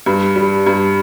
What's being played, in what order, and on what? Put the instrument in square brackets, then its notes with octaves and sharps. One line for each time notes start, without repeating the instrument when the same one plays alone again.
[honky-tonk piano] G2
G3
G2